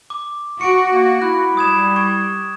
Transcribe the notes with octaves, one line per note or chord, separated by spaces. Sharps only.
D6
F#4 C#6 C#7 D7
A#3
E4 F#6
G3 D#6 G#6 E7
C#6 G#6